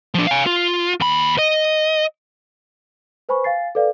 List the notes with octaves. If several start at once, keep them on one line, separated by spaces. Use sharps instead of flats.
F3 D4
F5 G#5
F4
D#2 B5
D#5
B4 C5 G#5 B5 C#6
F5 G#5 A6 C7
A4 B4 D5 F5